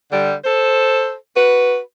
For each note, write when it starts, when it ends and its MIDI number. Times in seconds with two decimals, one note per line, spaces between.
0.12 0.35 50
0.12 0.35 55
0.44 1.14 69
0.44 1.14 72
1.36 1.79 66
1.36 1.79 71